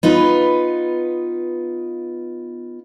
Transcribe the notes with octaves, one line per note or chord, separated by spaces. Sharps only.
B3 D#4 F4 B4